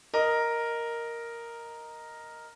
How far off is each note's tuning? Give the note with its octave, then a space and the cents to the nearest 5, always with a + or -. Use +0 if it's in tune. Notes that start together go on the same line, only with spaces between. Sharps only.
A#4 +0 D#5 +0